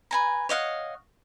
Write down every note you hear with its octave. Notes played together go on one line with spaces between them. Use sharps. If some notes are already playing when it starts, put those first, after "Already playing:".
B4 G#5 A#5
C#5 D#5 F5 F#5